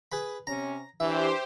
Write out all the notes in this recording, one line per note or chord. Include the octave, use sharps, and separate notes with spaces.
G#4 B4 B5
C3 C#4 A#5
E3 D4 G4 B4 C5 E5